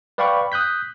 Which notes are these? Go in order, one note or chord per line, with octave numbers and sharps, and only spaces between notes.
B4 D5 F5 G5 B5 C#6
D#6 F#6 G6 B6